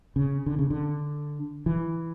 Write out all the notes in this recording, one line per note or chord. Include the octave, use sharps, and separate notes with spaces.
C#3
D3
C#3
D3
E3